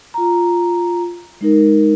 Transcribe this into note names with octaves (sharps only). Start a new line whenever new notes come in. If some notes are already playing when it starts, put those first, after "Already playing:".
F4 A#5
G#3 D#4 A#4